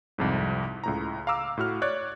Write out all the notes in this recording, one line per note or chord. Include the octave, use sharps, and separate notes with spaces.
C2 F2 G#2
C#2 A2 A#5
F5 A#5 D6 E6
A2 F#4 F6
C#5 D5 F#6